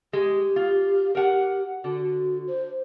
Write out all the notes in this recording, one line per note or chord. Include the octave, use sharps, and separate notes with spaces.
G#3 G4
F4
G4 A#4 F#5
D3 F#4
C5